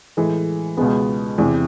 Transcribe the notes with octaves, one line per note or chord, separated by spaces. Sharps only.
A2 E3 G#3
C#2 B2 G#3 B3
E2 C3 E3